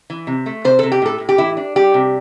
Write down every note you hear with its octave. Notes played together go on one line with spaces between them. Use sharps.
E3
C3
A3
C3 C5
C3 A4
G4
A2 A4
A2
G4
E3 E4
D4
G3 G4
C3